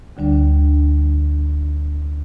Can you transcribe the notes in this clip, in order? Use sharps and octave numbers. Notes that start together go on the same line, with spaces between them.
D2 D3 G3 D4